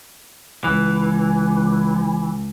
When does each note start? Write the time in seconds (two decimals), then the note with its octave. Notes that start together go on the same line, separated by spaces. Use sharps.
0.64 C#2 E3